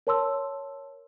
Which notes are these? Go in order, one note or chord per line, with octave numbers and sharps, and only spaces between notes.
A#4 C#5 A5 C6 E6